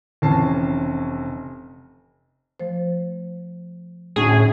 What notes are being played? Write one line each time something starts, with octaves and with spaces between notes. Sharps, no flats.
F1 C3 E3 C#4 A5 C7
F3 A3 C5
D2 A2 C#4 D#4 G#4 C#6